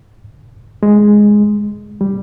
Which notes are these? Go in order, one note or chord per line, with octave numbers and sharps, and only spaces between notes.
G#3
G3